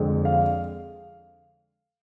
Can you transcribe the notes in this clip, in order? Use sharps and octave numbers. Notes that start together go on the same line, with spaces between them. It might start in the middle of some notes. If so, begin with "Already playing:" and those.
Already playing: F2 D3 G#3 C4
F5